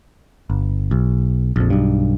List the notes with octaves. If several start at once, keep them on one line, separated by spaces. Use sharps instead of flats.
G1
B1
A#1 F2
B1 G2